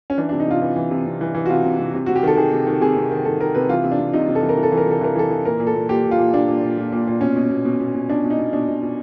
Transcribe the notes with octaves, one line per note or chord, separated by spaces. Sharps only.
C#4
E3 D4
D4
C3
D#4
C3 F4
E3
E3
C3
C3
E3
E3
F#4
C3 F4
C3
C3
C3
C3 F#4
G4
D#3 A4
D#3 G#4
C3
D#3
C3 G#4
C3
D#3
D#3 A4
D#3 A#4
C3 B4
E3 F4
C3
D4
C3
C3 D#4
C3
A4
E3
A#4
E3
A4
E3
A#4
C3 A4
E3 A#4
E3 A4
E3
A#2 A#4
A#2
A4
A#2
A#2 G4
A#2
F4
A#2
A#2 D4
A#2
A#2
A#2
A#2
A#2
B2 C#4
B2
B2
B2
B2
B2
B2 D4
B2
D#4
B2
B2 D4
B2
B2